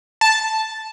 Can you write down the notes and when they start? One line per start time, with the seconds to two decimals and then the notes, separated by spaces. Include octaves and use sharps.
0.21 A5